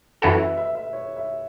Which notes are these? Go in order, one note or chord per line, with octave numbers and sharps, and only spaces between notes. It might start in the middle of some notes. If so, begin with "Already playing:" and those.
F#2 E3 C#4 F#4 A4 B4
E5
E5
E5
C#5
E5